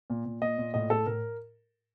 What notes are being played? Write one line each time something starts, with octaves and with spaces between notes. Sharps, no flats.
A#2
A#2
A#2 D#5
A#2
A2 D#5
A2 A4
A2 A#4